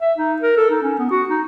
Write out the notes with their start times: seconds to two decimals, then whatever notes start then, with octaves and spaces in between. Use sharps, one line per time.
0.01 E5
0.17 D#4
0.42 A#4
0.57 A4
0.70 D#4
0.82 C#4
0.99 B3
1.10 F#4
1.29 D#4